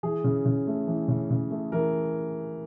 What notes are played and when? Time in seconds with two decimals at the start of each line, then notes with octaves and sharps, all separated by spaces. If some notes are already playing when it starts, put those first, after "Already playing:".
0.03 E3 G#4
0.24 C#3
0.46 C#3
0.67 A3
0.87 E3
1.08 C#3
1.30 C#3
1.51 A3
1.72 E3 A#4